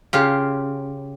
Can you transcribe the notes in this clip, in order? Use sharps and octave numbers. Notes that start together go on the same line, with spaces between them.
C#3 F4 G4